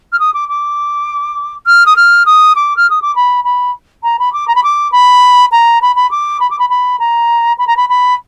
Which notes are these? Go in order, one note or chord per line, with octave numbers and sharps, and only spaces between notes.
F6
D#6
D6
D6
F6
D#6
F6
D#6
D6
F6
D#6
D6
B5
B5
A#5
B5
D6
A#5
B5
D6
B5
A#5
B5
B5
D6
B5
D6
B5
B5
A#5
B5
A#5
B5
B5